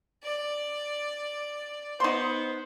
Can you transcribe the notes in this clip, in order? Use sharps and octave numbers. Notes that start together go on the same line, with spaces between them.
D5
B3 D#4 C5 C6